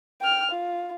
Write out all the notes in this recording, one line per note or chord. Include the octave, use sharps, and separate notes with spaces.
G5 F6
F4